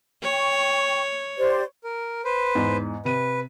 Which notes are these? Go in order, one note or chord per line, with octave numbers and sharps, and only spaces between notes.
C#5 G5 C#6
G4 C5 D5
A#4
B4 C5
E2 G#2
C3 B4 D#7